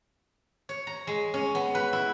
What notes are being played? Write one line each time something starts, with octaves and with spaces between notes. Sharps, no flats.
C#5
A#5
G#3
C#4
B3
B4
E4